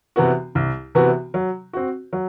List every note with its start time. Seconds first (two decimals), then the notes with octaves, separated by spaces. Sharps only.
0.16 C3 E3 B3 F#4
0.55 C2
0.95 C3 E3 B3 F#4
1.34 F#3
1.73 C4 F#4
2.13 F#3